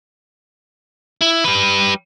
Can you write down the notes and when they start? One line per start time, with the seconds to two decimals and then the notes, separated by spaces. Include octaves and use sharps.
1.21 E4
1.44 G3 B4